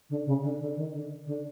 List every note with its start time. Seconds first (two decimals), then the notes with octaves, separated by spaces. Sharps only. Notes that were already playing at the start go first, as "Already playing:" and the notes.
0.10 D3
0.26 C#3
0.43 D3
0.60 D3
0.77 D#3
0.93 D3
1.26 D3